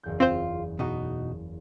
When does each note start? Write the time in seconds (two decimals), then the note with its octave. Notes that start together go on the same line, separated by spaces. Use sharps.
0.03 F#1 E2 G6
0.20 C4 F4 C5
0.79 B2 D#4 F#4